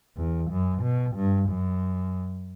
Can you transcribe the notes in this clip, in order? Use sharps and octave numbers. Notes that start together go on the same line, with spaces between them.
E2
F#2
B2
G2
F#2